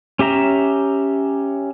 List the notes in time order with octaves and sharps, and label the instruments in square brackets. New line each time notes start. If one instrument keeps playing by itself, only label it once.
[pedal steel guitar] C#4 G4 E5 A#5